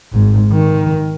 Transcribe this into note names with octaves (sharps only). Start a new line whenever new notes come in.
G#1 G#2
D#3